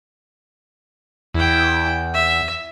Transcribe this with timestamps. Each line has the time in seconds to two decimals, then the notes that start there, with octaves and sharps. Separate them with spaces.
1.34 E2 E4 G5
2.14 E5